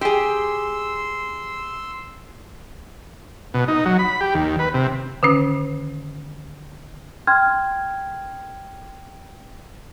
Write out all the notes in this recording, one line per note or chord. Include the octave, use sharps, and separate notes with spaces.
G4 G#4 C6 E6
B2
D#4
F#3
B5
G4
D#2
B4
C3
D3 D#3 C#4
G5 C6 F6 G#6